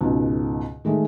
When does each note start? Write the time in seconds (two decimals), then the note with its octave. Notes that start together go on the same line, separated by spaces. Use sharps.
0.01 C#2 G#2 B2
0.85 D#3 G#3 A3